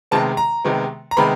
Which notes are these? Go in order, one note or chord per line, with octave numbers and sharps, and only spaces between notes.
C3 D#3 G#3 B3 A5
A#5
C3 D#3 G#3 B3
A#5
C3 D#3 G#3 B3 B5